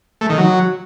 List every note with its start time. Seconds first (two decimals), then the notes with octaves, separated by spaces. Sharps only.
0.21 A3
0.29 D#3
0.38 F#3